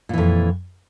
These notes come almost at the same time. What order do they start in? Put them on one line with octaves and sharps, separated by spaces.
A#2 E3 F2